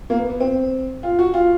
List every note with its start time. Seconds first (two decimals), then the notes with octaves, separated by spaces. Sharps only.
0.10 A#3
0.19 B3
0.30 B3
0.40 C4
1.03 F4
1.19 F#4
1.34 F4